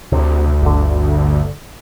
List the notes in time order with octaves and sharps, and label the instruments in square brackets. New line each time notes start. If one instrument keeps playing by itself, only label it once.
[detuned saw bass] D2 [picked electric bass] C3
[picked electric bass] G1 D3